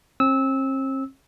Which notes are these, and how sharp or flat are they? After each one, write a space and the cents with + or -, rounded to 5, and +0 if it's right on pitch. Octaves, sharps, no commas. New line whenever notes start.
C4 +40 E6 -20